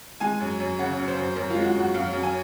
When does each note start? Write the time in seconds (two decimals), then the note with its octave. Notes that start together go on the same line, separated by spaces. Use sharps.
0.20 G#3 G#5
0.40 F#2
0.60 F#2
0.79 C#3 F#5
0.97 F#2
1.08 C5
1.17 F#2
1.36 F#2 A#4
1.50 G#3 F4
1.65 F#4
1.75 F#2 F#4
1.94 F#2 F5
2.13 F#2
2.23 G#5